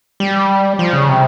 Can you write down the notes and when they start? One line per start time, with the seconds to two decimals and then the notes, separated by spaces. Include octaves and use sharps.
0.20 G3
0.79 F3
0.93 C#3
1.09 C3